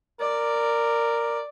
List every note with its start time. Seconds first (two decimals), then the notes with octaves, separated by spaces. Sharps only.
0.20 A#4 D5